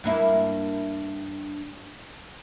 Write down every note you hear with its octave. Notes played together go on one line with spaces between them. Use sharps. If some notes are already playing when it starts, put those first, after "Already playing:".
G2 A#3 E4